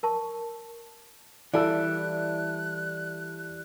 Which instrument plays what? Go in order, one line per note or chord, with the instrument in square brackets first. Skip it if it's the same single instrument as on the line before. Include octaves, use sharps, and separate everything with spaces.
[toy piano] A#4 A5 C#6
[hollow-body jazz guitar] E3 G3 [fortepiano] E4 A4 [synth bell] D5 [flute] F#6